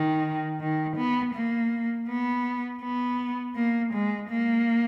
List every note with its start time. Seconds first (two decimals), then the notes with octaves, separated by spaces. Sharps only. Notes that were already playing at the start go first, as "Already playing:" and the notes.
Already playing: D#3
0.61 D#3
0.97 B3
1.34 A#3
2.08 B3
2.82 B3
3.56 A#3
3.93 G#3
4.29 A#3